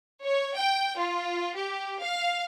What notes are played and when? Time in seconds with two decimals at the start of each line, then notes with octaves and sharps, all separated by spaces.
0.23 C#5
0.56 G5
0.97 F4
1.55 G4
2.01 F5